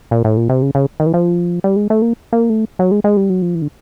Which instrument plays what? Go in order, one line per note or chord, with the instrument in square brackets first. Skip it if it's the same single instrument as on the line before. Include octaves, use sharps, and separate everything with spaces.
[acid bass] A#2
A2
A#2
C3
C#3
C#3
D#3
E3
F3
G3
G#3
A3
A#3
A#3
A3
F#3
G#3
G#3
G3
F#3
F3
E3
D3